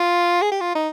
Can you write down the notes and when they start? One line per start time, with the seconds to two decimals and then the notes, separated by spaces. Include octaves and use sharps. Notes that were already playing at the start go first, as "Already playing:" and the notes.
Already playing: F4
0.42 G#4
0.52 G4
0.61 F4
0.75 D#4